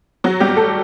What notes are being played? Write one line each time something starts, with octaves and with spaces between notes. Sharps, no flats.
F#3 F#4
G3 G4
F#3
A3 A4